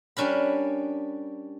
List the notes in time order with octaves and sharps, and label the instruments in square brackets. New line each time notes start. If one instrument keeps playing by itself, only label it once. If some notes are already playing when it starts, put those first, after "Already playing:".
[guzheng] G3 C#4 D4 A#4 B5